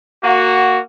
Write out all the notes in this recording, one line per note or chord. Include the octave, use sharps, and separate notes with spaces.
A#3 F#4